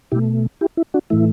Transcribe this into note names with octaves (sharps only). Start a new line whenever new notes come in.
B2 A3 E4 G4
E4 G4
E4
D4 F#4
A2 E3 A3 E4